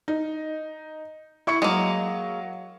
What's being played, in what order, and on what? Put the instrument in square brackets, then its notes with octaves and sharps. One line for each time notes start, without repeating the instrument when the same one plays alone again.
[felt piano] D#4
E4 C#6 C#7
[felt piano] F#3 [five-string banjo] G#3 A#3